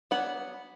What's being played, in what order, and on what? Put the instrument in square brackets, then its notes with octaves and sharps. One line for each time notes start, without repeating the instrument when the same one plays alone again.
[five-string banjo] F#3 B3 D4 F#5